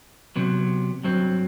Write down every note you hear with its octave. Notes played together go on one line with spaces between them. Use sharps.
C3 F#3 B3
G2 F#3 C4